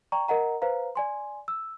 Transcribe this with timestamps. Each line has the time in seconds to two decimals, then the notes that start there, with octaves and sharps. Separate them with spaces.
0.12 D5 G5 A#5 C#6
0.28 A#4 D#5 F#5 A#5
0.62 B4 C5 F5 A#5
0.96 D5 G#5 C6
1.48 E6